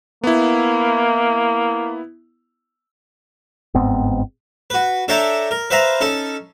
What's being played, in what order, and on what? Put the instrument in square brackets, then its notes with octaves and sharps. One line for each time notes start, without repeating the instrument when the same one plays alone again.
[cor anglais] A#3 [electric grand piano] B3 E4
[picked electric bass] G1 G#2 B3 C4
[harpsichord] F#4 B4
D4 A4 C#5 E5 G5 A#5
A#4
B4 C5 E5 F5 A#5
C#4 D#4 A4